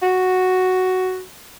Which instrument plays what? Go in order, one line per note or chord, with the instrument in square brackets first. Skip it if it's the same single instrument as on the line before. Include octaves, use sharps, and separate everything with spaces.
[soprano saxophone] F#4